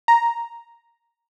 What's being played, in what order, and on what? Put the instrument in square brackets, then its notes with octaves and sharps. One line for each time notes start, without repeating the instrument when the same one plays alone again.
[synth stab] A#5